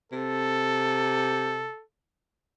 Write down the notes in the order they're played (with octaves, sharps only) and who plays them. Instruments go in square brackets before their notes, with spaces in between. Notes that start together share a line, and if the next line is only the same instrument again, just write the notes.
[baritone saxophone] C3 [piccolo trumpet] A4